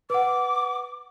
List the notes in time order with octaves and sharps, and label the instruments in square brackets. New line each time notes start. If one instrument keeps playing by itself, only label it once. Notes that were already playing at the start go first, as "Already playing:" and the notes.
[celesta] B4 F#5 [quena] D6